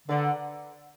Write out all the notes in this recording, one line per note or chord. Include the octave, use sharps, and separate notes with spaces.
D3 B4 D5 F#5 A#5